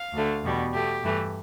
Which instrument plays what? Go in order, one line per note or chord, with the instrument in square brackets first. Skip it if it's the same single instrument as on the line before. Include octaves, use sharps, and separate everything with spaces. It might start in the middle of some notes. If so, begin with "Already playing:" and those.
Already playing: [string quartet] F5
D2 D3 A3
E2 B2 G3
B2 A3 G4
G2 E3 A3